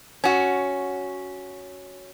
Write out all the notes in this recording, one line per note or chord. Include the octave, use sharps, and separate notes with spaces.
C#4 F#4